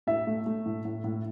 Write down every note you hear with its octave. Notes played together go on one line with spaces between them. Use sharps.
A2 E5
A3
A3
A2
A2
A2